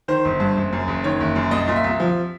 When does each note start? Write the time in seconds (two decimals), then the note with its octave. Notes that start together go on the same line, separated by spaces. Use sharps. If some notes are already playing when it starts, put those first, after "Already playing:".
0.08 D#3 C5
0.25 G1
0.40 G2
0.56 F#1
0.73 F#2
0.88 F#1
1.04 D#3 C#5
1.21 F#1
1.36 F#2
1.51 C2 D#5
1.68 A#2
1.76 E5
1.84 C2
2.00 F3